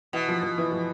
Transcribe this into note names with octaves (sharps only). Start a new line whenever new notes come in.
B2 E3
F3
F3
E3
F3